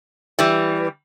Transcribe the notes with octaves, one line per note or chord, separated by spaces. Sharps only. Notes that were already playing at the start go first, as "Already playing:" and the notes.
E3 G3